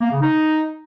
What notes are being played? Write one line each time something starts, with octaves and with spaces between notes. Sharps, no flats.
A#3
C#3
D#4